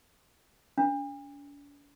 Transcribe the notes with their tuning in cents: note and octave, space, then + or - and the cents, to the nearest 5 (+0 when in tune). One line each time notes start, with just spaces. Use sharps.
D4 -45